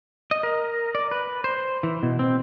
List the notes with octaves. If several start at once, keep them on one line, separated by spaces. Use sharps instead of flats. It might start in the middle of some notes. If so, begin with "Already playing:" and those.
D#5
A#4
D5
B4
C5
E3
B2
C4